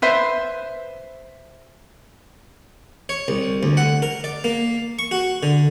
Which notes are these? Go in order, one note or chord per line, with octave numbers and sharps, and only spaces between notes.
B4 C5 E5
C#5
C2
D2
F#5
A#4
D5
A#3
C#6
F#4
D3